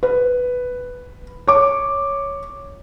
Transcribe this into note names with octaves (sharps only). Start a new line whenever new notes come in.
B4
C#5 D6